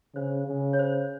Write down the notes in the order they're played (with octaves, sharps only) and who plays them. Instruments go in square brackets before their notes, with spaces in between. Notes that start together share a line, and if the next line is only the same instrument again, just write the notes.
[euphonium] C#3 [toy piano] C5
[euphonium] C#3
[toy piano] C#5
C5